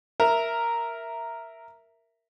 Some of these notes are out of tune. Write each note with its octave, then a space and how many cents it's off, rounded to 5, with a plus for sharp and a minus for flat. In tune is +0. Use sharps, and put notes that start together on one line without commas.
A#4 +0 E5 +0